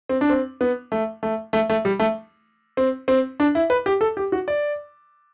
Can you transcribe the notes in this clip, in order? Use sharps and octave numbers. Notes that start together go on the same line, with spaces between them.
C4
D4
C4
B3
A3
A3
A3
A3
G3
A3
C4
C4
D4
E4
B4
G4
A4
G4
F#4
D5